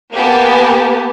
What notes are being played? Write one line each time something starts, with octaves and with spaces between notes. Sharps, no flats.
A#3 B3 G4 G#5 A5